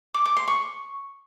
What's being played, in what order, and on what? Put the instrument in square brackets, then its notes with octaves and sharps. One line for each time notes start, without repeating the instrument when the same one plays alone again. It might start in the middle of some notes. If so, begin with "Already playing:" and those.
[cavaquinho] D6
D6
C6
C#6